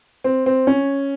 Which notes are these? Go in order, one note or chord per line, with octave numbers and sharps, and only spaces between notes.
C4
C4
C#4